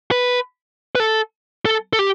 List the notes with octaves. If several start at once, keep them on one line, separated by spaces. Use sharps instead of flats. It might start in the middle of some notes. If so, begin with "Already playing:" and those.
B4
B4
A4
A4
A4
G4